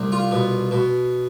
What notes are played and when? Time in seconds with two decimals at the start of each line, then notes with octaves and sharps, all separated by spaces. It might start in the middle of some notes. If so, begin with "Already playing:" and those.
Already playing: C2
0.12 F4
0.31 B2
0.71 B2